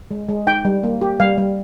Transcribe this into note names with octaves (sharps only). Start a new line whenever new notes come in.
G#3
G#3
D#4 G5
G3
A#3
G4
G3 F5
G3